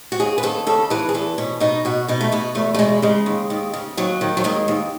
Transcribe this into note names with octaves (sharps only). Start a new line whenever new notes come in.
F#4
D#2 G#4
B4
D#2 A4
C#3 A4
E3 B4
G#4
E2 A4
B2 C#4
B2 D#4
B2 F#4
B2 D#4
A3
B2 B3
E2 A3
A3
B2 G#3
C#3 G#3
D#2
D#2
C#3
D#2 F#3
D#3
F#3
D#2 G#3
D#2